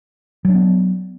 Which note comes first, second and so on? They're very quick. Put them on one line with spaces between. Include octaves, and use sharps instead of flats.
F#3 D4 B3